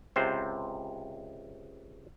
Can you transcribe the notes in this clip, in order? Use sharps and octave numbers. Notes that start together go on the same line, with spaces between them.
C#2 C3 C5